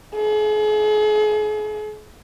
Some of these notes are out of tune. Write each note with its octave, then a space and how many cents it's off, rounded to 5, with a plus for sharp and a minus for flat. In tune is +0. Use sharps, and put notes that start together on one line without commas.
G#4 +40